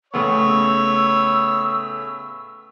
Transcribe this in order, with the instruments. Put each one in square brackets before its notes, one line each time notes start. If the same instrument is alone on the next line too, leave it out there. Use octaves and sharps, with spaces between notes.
[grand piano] A2 C#3 B3 [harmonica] C#5 [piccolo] E6